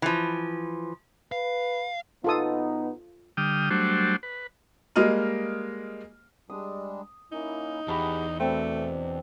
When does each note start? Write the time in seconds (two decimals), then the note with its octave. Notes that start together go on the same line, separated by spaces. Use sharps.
0.02 E3 F3
1.32 B4 F5
2.24 B2 B3 D#4 F4 A4 D#6
3.37 D3 G3 G5 D#6 F6
3.70 F#3 G3 A3 D4 F#4 C5
4.23 B4
4.96 G3 G#3 A#3 D#5 F6 D#7
6.50 G3 G#3 D4 D#6
7.32 A#3 C#4 D#4 E4
7.88 E2 G4 G#4 F#5 A#5 B5 C#6
8.40 B2 A3 C4 D4